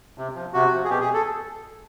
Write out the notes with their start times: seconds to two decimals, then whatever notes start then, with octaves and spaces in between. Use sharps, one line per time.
0.18 C3
0.35 F3
0.53 C3 F#4
0.71 F3
0.84 G#4
0.89 B2 G4
1.01 G#4
1.14 A4